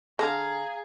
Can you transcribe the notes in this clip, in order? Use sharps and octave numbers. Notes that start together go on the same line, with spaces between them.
D3 G#4 A4 F5 A#5